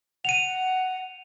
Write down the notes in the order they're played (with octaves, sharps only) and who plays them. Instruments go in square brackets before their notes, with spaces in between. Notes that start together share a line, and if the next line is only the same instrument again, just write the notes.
[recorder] F#5 [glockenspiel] D#7 F7